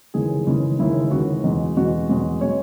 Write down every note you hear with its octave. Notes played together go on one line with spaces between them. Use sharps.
D#2 C#3 E3 G#3 G#4
D#2 C#3 E3 G#3
D#2 C#3 E3 G#3 E4
D#2 C#3 E3 G#3 F#4
E2 B2 G#3
E2 B2 G#3 F#4
E2 B2 G#3
B2 G#3 C#5